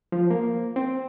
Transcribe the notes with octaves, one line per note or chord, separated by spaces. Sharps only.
F3
A#3
C4